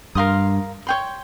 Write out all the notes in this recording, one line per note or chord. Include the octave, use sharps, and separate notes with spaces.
G2 A#4 F5 C6 D#6
C#5 G5 C6